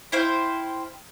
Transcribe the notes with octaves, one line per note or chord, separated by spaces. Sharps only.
E4 C5 F5 G5